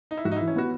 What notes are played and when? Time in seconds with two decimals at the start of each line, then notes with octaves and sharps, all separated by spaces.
0.11 D#4
0.17 E4
0.25 G#2 F#4
0.31 D#4
0.36 E3 E4
0.47 C#4
0.56 B3 F#4